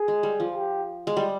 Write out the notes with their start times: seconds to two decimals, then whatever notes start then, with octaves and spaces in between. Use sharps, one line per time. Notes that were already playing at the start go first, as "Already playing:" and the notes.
Already playing: G#4
0.08 G#3
0.23 G3
0.40 F3
0.54 G4
1.07 G#3
1.17 G3